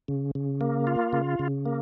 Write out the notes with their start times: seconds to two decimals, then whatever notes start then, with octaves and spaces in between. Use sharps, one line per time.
0.08 C#3
0.35 C#3
0.61 A#3
0.87 F4
1.13 C#3
1.39 C#3
1.65 A#3